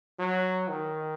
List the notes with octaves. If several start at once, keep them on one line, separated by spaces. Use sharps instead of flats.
F#3
D#3